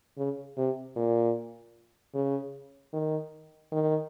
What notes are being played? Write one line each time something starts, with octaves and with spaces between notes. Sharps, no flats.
C#3
C3
A#2
C#3
D#3
D#3